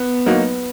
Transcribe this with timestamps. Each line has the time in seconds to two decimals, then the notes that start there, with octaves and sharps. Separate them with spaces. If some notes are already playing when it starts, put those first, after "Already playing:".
Already playing: B3
0.26 F#3 A#3 D#4 F#4